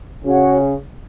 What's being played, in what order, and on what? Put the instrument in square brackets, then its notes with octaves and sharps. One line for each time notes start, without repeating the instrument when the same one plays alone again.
[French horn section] C#3 C#4 [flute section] F#4 C#5 F#5